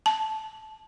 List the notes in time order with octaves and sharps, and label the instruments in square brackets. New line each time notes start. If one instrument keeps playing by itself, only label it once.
[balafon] A5